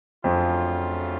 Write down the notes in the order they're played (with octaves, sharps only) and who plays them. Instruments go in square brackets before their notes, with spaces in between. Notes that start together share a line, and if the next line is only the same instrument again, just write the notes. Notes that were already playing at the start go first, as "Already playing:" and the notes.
[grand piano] F2 F3 [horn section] C#3 F#3 A3 D4 F4